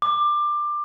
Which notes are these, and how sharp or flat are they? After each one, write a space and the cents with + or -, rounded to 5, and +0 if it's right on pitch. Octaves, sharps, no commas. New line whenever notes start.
D6 +20